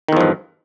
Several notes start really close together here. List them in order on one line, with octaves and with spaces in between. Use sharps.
D#3 E2 F3 G2